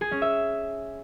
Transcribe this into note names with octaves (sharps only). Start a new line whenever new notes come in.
G#4
C#4
E5